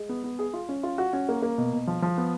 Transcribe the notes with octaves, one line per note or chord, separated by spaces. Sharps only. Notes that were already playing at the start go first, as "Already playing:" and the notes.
Already playing: G#3
B3
B3
G#4
F4
C#4
F4
F#4
C#4
A#3
A#3
B2
B2
F3
F3
B3